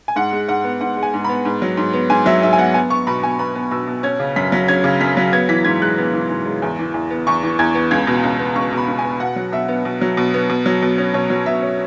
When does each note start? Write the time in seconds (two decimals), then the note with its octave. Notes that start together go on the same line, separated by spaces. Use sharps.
0.08 G#5
0.16 G#2 F#5
0.33 G#3
0.48 G#2 F#5
0.64 B3
0.81 G#2 F#5
0.97 G#3
1.03 G#5
1.14 G#2
1.24 B3 B5
1.45 G#2
1.62 F#3
1.77 G#2
1.93 B3
2.10 G#2 G#5
2.26 F#3 E5
2.42 G#2 E5
2.53 G#5
2.58 B3 F#5
2.74 B3 G#5
2.90 B3 C#6
3.07 B2 B5
3.23 B2 G#5
3.39 B3 B5
3.55 B3
3.71 B2 E6
3.88 B2
4.03 C#4 G#6
4.20 C#3
4.36 F#2 B6
4.52 F#3
4.68 C#4 G#6
4.84 C#3
5.01 F#2 B6
5.17 F#3
5.33 B3 G#6
5.49 E3 B6
5.65 G#2 G#6
5.81 G#3 F#6
5.98 B3
6.13 E3
6.30 G#2
6.45 G#3
6.62 E2
6.79 E3
6.94 E2
7.10 B3
7.27 E2 C#6
7.43 E3
7.59 E2 G#6
7.75 B3
7.91 C#2 G#6
8.07 B2
8.23 C#2
8.39 B3
8.55 C#2 C#6
8.73 B2 B5
8.88 C#2
8.99 G#5
9.04 B3
9.20 B2 F#5
9.36 F#3
9.52 B2 E5
9.68 B3
9.85 B2
10.01 F#3
10.17 B2
10.34 B3
10.49 B2
10.66 F#3
10.82 B2
10.98 C#4
11.14 B2 C#5
11.30 F#3
11.46 B2 E5
11.62 C#4